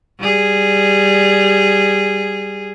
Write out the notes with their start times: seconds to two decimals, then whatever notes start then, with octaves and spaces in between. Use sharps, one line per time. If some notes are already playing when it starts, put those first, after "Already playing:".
0.19 G3 G#4